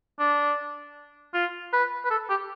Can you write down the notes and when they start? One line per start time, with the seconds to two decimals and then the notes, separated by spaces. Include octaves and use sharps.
0.19 D4
1.34 F4
1.73 B4
2.05 B4
2.10 A4
2.29 G4